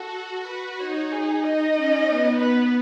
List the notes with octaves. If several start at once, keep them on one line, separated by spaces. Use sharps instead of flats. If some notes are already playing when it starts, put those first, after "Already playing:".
Already playing: F#4 A4
B4
D#4 C#5
G#4
D#4 D#5
C#4
B3
B4